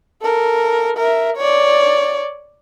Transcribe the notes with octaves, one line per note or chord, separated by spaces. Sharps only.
A4 A#4
A#4 E5
C#5 D5